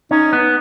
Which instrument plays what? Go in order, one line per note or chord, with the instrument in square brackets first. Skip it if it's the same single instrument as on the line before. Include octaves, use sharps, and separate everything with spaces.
[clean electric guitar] C#4 [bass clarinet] D#4
[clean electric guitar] B3